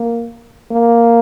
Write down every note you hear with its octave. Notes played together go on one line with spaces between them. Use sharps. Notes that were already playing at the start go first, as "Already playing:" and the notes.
Already playing: A#3
A#3